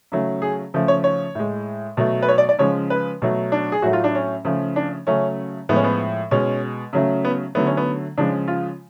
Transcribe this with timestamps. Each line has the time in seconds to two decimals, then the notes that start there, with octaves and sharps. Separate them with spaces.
0.12 C#3 F#3 A3
0.42 G#4
0.74 C#3 F3 A3
0.88 C#5
1.04 C#5
1.35 A2 G#3
1.97 B2 F#3 A3
2.23 B4
2.29 C#5
2.38 D5
2.49 D5
2.59 C#3 F3 G#3 C#5
2.90 B4
3.22 B2 F#3 A3
3.52 D4
3.72 G#4
3.82 A2 F#3 A3 F#4
3.93 F4
4.04 D4
4.15 C#4
4.45 C#3 F3 A3
4.76 D4
5.07 C#3 F#3 A3 C#4
5.69 A2 F3 G#3 B3
5.76 C#4
5.84 B3
6.31 B2 G#3 C#4
6.93 C#3 F#3 A3
7.25 B3
7.55 D3 F#3 A3 B3
7.67 C#4
7.77 B3
8.18 C#3 F3 G#3 D4
8.48 F4